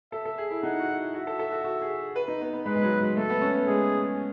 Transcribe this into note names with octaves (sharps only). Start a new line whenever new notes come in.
A4 E5
A4
G#4
E4
D#4 F#5
F#4
E4
F#4 E5
A4
A4
F#4
F#4
G#4
B4
D#4
B3
B3
G#3 B4
G#3
F#3
G#3
A3 A4
B3
C#4
B3
G#3 G#4